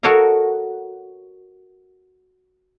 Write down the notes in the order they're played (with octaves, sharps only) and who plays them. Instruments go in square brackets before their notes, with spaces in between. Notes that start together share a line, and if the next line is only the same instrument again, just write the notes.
[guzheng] F#4 A4 A#4 C#5 D#5 F5